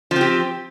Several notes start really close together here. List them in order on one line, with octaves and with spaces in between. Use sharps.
F3 C4 G4